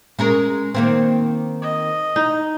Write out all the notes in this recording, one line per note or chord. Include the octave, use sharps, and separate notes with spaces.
G#3 C#4 A#4
D#3 A#3 C4
D#5
D#4